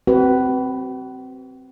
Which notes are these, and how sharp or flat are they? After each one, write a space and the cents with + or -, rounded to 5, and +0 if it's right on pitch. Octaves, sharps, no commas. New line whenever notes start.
C4 +0 F#4 +45 B4 +0